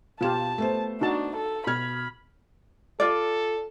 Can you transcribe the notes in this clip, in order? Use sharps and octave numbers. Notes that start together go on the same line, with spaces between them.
B2 F4 G4 A5 E7
A3 B3 C5
D4 D#4 F#4 A5
A4
B2 B5 F6 G#6
F4 A4 D5